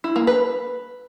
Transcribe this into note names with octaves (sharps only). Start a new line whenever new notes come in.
E4
A#3
B4